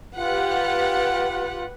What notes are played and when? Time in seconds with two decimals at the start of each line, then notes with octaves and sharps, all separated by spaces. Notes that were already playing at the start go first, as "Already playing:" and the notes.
0.16 F4 G4 B4 F#5